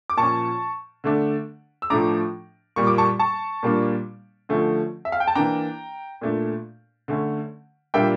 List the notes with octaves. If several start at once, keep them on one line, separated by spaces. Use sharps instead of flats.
D6
A#2 F3 C#4 A5 C#6
D3 A3 D4
E6
A2 F3 A3 D4 A#5 D6
A#2 G3 A#3 C#6
D6
A5 C#6
A5 C#6
A#2 G3 A#3 D4
D3 F3 A3 C#4
E5
F5
G5
A5
E3 A#3 D4 G5 A#5
A#2 A3 D4
D3 A3 C#4
A#2 G3 A#3 D4 E5 G5